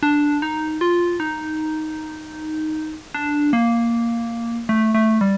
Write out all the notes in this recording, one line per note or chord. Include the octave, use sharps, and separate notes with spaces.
D4
D#4
F4
D#4
D4
A#3
A3
A3
G3